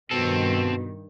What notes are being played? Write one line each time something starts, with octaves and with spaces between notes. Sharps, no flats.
G2 B2 D#3 C4 A4